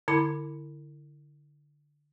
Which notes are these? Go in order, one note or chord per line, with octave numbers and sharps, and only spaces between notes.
D3 E4 A5 B5 D6